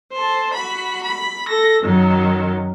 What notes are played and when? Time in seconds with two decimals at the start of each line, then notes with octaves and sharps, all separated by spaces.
0.12 A4 C5
0.53 F#4 B5
1.03 B5
1.48 A4 A#6
1.81 F#2 D#3 F#3